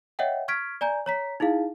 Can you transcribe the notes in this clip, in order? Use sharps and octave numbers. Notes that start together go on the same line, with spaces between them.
C#5 D#5 E5 F#5 G5
C#6 F6 G#6 B6 D7
D5 G#5 A#5 G6
C#5 A#5 B6
D#4 E4 G#4 F5